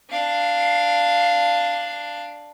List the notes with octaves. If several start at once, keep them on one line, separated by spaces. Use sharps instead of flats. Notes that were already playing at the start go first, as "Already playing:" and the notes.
D4 F5